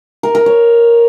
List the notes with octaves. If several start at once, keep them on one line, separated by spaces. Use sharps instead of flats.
A#4
A#4
C#5